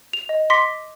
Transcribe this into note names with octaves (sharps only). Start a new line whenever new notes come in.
F7
D#5
C6 D6 A#6 B6 C#7